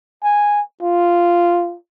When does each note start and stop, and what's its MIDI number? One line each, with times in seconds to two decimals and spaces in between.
0.23 0.61 80
0.82 1.76 65